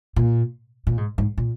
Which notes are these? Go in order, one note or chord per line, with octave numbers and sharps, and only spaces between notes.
A#2
A#2
G#2
G#2
A#2